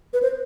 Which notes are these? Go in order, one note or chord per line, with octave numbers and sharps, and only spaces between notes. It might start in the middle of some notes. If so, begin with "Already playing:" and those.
B4
C5